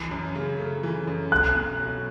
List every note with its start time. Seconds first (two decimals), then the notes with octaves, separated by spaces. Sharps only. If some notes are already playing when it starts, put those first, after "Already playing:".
Already playing: E3
0.11 F#2
0.35 C#3
0.59 A3
0.83 E3
1.07 F#2
1.32 A3 F#6
1.56 B2
1.80 F#3